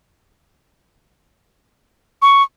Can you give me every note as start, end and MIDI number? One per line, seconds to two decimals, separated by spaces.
2.22 2.43 85